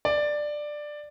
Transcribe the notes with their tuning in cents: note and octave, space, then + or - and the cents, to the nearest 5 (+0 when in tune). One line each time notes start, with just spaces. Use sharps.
D5 +10